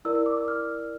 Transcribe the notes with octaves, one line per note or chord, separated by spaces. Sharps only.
E4 A#4 D5 E6
E6
D6
E6
F6